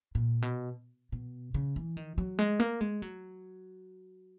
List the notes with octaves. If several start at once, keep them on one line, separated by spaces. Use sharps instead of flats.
A#2
B2
B2
C#3
E3
D#3
F#3
G#3
A#3
G#3
F#3